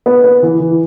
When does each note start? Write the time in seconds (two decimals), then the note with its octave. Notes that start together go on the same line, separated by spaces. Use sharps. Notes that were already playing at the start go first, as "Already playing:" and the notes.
0.06 B3
0.24 B3
0.42 E3
0.60 E3